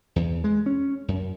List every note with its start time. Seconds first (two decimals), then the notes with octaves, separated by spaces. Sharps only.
0.16 E2
0.44 G#3
0.66 C#4
1.08 F#2